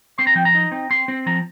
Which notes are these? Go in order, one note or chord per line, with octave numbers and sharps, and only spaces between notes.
C4 C6
A#5
F3 G5
A#5
D#4
C4
C4 C6
C4
F3 A#5